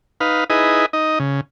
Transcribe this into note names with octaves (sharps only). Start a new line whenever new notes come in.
D#4 B4 F5
D#4 E4 G#4 B4 D#5
D#4 D#5
C#3